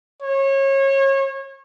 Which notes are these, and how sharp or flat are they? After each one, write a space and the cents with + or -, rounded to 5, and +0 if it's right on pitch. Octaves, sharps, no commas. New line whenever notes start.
C#5 -30